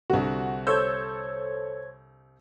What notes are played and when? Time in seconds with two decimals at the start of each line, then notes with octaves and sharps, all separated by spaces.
0.10 C2 D3 F#4
0.67 A4 C5 C#5 E6 G6 G#6